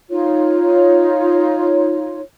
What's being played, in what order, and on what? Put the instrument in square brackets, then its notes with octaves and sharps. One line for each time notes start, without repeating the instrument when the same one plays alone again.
[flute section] D#4 F4 C#5